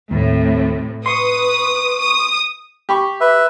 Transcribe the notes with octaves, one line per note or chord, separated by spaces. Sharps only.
D#2 A2 C3
B4 C6 C#6 D#6
D#6
G4 B5 C#6
B4 E5